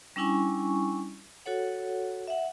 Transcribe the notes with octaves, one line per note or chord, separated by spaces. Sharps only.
G3 C#4 D4 E4 G#5 C#6
F#4 A4 C#5 F#5
E5 F#5